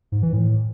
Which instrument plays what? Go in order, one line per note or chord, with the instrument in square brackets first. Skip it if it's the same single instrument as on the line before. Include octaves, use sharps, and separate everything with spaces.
[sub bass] G#2
E3
A2